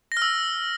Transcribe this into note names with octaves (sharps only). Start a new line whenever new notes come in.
A#6
F6
E6